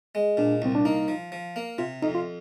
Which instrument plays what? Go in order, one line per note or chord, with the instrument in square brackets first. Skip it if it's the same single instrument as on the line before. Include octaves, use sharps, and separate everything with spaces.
[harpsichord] G#3
[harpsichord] A#2 [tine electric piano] D4
[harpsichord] C2 [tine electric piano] C4
[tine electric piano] D4
[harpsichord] A#3 [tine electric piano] D#4
[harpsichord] F3
F3
A#3
[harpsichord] C3 [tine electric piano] F4
[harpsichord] F2 [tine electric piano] D#4
[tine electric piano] F4